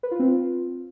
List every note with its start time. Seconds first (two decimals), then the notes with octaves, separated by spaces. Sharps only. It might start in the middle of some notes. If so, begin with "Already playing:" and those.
0.03 B4
0.11 F4
0.19 C4
0.28 F4